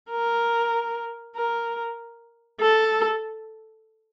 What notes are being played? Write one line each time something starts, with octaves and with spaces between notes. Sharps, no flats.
A#4
A#4
A4